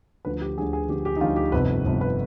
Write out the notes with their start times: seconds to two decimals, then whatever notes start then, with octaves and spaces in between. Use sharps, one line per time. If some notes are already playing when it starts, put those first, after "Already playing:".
0.25 D2 D3 F3 B4
0.41 G4
0.57 D2 D3 F3 G#4
0.73 G#4
0.89 D2 D3 F3 G4
1.05 G4
1.17 D#4
1.21 D2 D3 F3 F4
1.36 G4
1.52 G1 F2 C3 F3 B4
1.85 G1 F2 C3 F3
2.01 B4